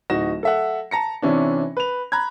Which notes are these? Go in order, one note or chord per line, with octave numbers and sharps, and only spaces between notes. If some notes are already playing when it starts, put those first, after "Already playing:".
D1 D#4 F#4 A#6 E7
A4 E5 F#5
A5 A#5 A#6 C#7
C3 E3 C#4 D4
B4 F7
A#5 B5 F#6 G#6